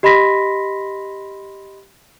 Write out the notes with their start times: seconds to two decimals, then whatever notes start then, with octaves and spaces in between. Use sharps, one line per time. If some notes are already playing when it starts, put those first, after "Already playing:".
0.03 G4 D#5 B5 C6 A#6 B6